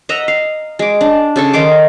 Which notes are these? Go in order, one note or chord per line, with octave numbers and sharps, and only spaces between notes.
D#5 E5 F#5 A#5
F5
G#3 D6
D4
C#3 A4 C#6
D#3 D#4 C6 D6